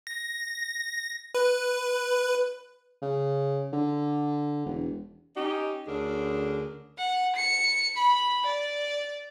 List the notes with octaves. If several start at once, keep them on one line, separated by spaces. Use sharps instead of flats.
A#6
B4
C#3
D3
E1
C#4 D#4 G4
D2 D3 C#4 D4 G#4 A#4
F#5
C#7
B5
D5